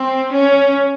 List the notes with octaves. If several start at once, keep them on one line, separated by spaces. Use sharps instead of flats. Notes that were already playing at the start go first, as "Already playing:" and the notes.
Already playing: C4
C#4